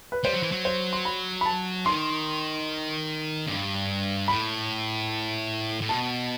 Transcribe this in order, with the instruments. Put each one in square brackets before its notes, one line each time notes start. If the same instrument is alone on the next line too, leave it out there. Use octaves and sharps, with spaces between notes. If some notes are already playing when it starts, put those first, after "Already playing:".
[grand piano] B4
[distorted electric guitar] G3 [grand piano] C5
[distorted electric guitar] F#3
E3
F#3
[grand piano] C5
C6
B5
B5
A5
[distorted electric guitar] D#3 [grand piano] C6
[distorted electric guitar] G2
[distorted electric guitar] A2 [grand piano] B5
[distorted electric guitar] A2
[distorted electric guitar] B2 [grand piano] A5